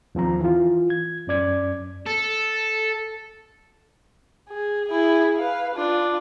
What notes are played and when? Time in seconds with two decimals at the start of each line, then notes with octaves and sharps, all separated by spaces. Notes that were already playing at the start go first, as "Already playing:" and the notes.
0.15 D#2 F3 C4 A#5
0.40 E3 F4
0.90 G#6
1.27 F#2 C#4 D5 G#6
2.07 A4
4.49 G#4
4.89 E4 G#4
5.37 B4 F5
5.75 D4 F4